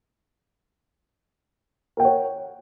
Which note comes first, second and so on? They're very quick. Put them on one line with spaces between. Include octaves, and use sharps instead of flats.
A#4 G5 F#5 C#5